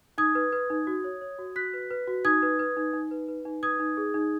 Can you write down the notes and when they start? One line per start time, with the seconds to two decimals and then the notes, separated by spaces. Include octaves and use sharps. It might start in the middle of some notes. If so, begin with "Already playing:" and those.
0.18 D#4 D#6 G#6
0.35 B4
0.52 B4
0.70 D#4
0.87 F#4
1.04 C#5
1.21 C#5
1.39 F#4
1.56 F#4 F#6 B6
1.74 B4
1.91 B4
2.07 F#4
2.25 D#4 D#6 G#6
2.42 B4
2.59 B4
2.77 D#4
2.93 D#4
3.11 B4
3.28 B4
3.45 D#4
3.63 B4 D#6 G#6
3.80 D#4
3.97 G#4
4.14 D#4